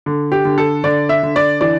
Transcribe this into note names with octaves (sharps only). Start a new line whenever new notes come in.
D3
G4
D3
A4
D3 D5
E5
D3
D5
E3 D5